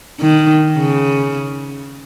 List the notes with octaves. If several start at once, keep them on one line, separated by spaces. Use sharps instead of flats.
D#3
C#3